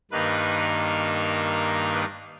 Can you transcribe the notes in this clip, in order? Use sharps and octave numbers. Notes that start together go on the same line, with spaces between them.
G2 D#3 A#3 D#4 B4
B4